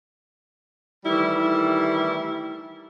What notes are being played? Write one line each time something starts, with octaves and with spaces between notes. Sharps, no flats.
D#3 E3 G3 A3 E4